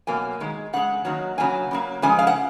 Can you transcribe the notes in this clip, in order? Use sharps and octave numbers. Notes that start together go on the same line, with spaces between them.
B2 F#3 A#3 G#5
D#3 G#3
C#3 G#3 F#5
D#3 F#3 A#3
C#3 F#3 A#3 G#5
C#3 F#3 A#3
C#3 F3 G#3 G#5
F5
F#5